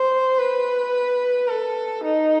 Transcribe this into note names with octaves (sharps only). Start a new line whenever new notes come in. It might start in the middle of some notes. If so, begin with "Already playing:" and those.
Already playing: C5
B4
A4
D#4